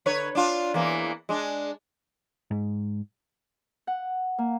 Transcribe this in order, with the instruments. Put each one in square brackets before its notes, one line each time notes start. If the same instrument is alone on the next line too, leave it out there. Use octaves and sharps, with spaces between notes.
[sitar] D3 B4 C#5
D4 F4
E2 E3 A#3
G#3 D4
[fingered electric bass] G#2
[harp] F#5
A#3